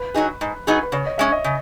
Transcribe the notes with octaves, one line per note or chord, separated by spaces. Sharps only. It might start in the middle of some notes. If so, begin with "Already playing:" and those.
Already playing: B4
F#3 B3 D#4 G#4
G#2
F#3 B3 D#4 G#4
B4
C#3 C#5
D#5
G#3 C#4 E5
D#5
C#3